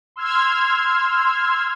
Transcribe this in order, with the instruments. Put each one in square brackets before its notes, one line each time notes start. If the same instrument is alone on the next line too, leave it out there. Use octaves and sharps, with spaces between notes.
[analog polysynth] C6 E6 F6 G#6